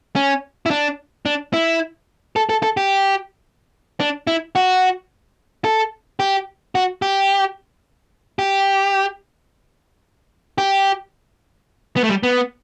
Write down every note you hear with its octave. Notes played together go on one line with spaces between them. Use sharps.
C#4
E4
D4
D4
E4
A4
A4
A4
G4
D4
E4
F#4
A4
G4
F#4
G4
G4
G4
B3
A3
G3
B3